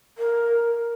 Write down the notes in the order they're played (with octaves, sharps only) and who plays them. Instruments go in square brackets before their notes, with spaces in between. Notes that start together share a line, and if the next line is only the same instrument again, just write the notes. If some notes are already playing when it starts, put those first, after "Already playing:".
[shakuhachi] A#4